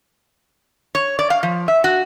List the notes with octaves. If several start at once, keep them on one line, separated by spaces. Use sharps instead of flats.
C#5
D5
F5
F3
E5
F#4